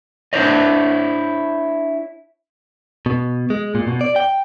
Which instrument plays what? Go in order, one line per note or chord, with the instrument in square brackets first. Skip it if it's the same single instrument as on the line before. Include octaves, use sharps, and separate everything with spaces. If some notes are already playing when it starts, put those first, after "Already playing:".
[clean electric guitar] D4 E4 C5 C#5 D#5
B2
G#3
A#2
B2
D5
G5